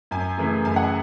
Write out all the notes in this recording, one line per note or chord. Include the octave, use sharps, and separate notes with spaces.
F#2 G#5
C#3 E3 A3
F#2 G#5
F#5